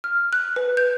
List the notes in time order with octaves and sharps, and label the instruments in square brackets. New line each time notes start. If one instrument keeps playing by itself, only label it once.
[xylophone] F6
F#6
B4
G6